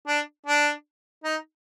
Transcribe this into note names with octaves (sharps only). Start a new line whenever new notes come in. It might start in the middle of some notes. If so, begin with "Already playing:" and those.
D4
D4
D#4